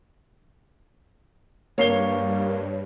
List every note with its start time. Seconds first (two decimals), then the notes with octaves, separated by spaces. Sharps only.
1.78 G2 A#3 C#5 C7 G7